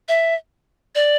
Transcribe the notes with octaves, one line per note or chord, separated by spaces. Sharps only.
E5
D5